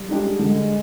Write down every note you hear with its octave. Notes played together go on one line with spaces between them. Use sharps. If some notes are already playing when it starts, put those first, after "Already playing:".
Already playing: G3
G#3 D4 G4
D3 G#3